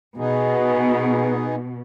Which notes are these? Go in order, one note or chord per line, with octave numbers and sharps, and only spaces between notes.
B2 B3 D#4 G#4